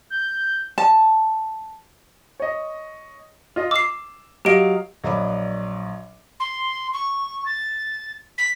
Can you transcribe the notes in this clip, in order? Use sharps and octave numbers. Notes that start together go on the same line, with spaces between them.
G6
A5
C#5 D#5
F4 D#5
D6 E6 C7
F#3 G4 D#5 F5 D7
A#1 F#3 D5 D#5 B5 D6
C6
C#6
A6
B6